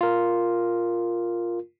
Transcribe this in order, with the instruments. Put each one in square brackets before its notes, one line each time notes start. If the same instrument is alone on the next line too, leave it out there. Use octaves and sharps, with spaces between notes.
[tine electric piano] F4 A#4